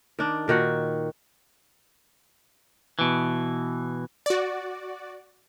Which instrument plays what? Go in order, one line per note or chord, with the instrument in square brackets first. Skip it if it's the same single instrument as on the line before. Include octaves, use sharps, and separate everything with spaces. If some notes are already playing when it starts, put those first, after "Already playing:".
[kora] D#3 D4
A#2 D#3 F#4 F#5
[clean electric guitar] B2 E3
[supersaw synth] F#4 D5